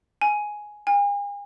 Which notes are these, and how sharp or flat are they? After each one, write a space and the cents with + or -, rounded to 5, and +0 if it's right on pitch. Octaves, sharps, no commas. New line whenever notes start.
G#5 +5
G#5 -45